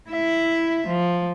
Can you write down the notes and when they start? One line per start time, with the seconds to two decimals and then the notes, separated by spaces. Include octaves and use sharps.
0.10 E4 E5
0.87 F3